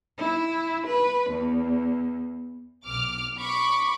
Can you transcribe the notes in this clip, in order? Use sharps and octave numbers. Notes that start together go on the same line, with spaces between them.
E4
B4
E2
B1 D6 F6
B5 C#6 D6